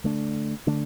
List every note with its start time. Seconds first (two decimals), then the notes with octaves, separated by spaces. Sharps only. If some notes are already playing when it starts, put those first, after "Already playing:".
0.04 D3 A3 D4
0.66 D3 A3 D4